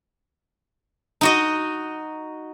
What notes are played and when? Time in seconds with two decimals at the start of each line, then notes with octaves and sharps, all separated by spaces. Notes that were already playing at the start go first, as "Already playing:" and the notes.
1.21 D#4 F#4 D#5